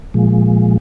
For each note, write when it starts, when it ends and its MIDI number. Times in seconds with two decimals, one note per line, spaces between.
0.14 0.77 46
0.14 0.77 53
0.14 0.77 56